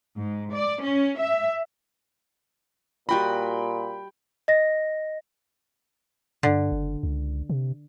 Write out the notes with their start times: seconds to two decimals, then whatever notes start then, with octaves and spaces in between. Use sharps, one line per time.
0.18 G#2
0.53 D5
0.82 C#4
1.18 E5
3.09 A#2 G3 F#4 D#5 G5 B5
4.48 D#5 A#6
6.43 G2 D3
6.72 F#1
7.03 C#2
7.50 C3